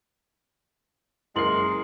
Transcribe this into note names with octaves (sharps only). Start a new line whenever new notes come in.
F#1 G#3 E4 A#4 C6 C7 F#7